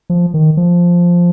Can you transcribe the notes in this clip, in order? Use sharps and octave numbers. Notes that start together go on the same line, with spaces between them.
F3
D#3
F3